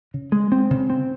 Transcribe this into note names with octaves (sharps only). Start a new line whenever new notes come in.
C#3
G#3
C4
C#3
C4